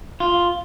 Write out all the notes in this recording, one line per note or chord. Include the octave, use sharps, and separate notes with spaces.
F4